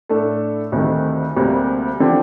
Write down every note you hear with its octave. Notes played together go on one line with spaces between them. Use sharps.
A2 A3 D4 A4
D2 C3 D#3 A3
D2 C3 G3 A#3
D3 F3 C4 G4